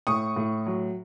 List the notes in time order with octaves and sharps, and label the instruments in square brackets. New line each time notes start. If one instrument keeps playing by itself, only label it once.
[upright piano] A2 C#6 D#6
A2
F#3